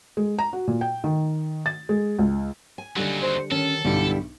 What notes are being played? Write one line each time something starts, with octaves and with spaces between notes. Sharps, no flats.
G#3
A#5
F#4
A#2
G5
D#3
A6
G#3
C#2
G#5
D#2 D3 F#3 G3
C5
D#3 C#4 A4
B1 G2 D3 G3 E4